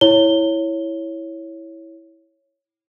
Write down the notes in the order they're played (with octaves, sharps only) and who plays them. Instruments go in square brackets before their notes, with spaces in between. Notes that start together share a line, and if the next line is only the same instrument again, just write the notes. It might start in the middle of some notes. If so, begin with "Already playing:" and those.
[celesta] E4 C#5 G7